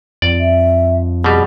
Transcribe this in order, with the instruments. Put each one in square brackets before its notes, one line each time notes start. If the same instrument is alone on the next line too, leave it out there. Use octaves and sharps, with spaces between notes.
[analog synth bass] F2 [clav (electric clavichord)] D5
[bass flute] E5
[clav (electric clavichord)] B2 G3 [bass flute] G#4